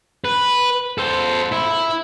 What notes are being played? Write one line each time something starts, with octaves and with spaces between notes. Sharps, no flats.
B4
A4 C5
E4